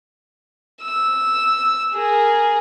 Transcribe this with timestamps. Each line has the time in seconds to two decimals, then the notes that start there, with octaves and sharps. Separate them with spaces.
0.83 E6
1.94 G#4 A#4